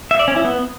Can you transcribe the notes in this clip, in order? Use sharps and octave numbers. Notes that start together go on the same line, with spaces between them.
E5
D5
C#4
E4
B3